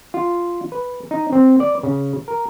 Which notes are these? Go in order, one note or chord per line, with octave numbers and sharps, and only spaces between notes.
F4
B4
D#4
C4
D5
C#3
A#4